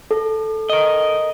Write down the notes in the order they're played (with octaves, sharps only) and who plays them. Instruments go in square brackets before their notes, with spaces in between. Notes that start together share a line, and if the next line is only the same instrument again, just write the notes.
[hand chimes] A4
[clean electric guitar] A#4 D#5